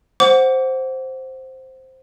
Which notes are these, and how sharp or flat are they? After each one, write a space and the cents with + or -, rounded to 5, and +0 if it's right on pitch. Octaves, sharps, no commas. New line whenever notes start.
C5 +0 F#5 +0 D6 -35